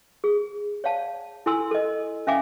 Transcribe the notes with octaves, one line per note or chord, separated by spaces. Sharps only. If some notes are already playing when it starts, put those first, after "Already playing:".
G#4
C#5 D5 F5 A5
E4 A4 G#5 C6 E6
A4 D#5
C#4 E5 F5 G#5 D6